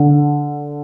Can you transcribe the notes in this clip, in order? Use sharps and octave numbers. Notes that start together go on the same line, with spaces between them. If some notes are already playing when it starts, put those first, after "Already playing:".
Already playing: D3